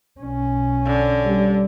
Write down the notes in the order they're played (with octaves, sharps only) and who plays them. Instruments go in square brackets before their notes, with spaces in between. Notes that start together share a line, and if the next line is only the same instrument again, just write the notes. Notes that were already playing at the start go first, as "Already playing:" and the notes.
[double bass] B1 C#4
[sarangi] D3
[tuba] G3